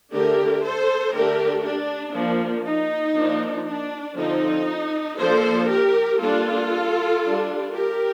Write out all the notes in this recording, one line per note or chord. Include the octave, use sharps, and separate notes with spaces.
D3 A3 D4 G4 A#4
A4 C5
D3 A3 D4 G4 A#4
D4
F3 A#3 D4
D#4
F3 A#3 D4
D4
D3 F3 C4 D#4
F3 A#3 D4 A4 C5
G4 A#4
G3 A#3 D4 F4 A4
G3 D4
G4 A#4